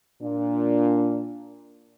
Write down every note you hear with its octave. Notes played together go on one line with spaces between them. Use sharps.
A#2 D4